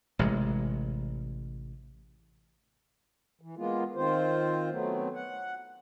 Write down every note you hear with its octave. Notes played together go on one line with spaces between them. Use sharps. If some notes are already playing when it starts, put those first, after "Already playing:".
A1 C3 G#3
E3
G#3 A#3 B3 F4
D#3 C4 F4 C5
F#3 A3 B3 C4
F#5